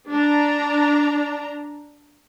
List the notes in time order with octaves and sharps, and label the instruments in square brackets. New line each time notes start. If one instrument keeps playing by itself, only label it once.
[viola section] D4 A#5